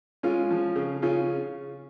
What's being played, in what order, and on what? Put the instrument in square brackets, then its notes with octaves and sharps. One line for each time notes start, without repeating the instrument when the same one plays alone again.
[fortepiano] G#3 C#4 F4
F3
C#3
C#3 C#4 F4